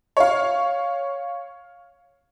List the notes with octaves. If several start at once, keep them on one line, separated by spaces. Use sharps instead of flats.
C#5 F5